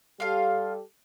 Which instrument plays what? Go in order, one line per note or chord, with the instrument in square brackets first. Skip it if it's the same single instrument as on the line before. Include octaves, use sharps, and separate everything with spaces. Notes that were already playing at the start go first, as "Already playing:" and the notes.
[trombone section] G3 G4 A4 [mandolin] F4 F5